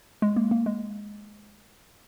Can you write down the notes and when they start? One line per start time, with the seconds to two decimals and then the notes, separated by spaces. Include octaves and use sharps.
0.22 G#3
0.36 A#3
0.51 A#3
0.66 G#3